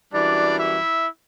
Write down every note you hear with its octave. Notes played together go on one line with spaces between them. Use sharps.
F#2 E3 G3 D4 D5
E4 E5